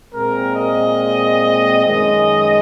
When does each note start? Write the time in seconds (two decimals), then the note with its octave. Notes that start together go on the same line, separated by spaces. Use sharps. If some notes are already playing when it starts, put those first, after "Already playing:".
0.13 A#2 G#3 C4 A#4
0.56 D#5
1.85 F#2 D#3 G#3 D#5